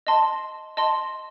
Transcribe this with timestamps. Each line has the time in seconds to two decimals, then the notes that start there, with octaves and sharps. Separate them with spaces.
0.07 D#5 A5 C6
0.77 D#5 A5 C6